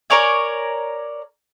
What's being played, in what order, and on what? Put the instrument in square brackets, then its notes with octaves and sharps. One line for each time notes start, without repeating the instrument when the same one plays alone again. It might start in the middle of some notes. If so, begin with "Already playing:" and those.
[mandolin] A#4 C#5 D5 G#5